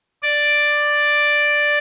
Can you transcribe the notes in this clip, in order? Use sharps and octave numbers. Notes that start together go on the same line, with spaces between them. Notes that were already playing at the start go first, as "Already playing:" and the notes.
D5